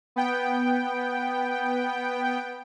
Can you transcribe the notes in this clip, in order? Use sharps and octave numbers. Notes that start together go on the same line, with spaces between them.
B3 G5